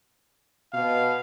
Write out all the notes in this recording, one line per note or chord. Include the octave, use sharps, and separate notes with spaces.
B2 F5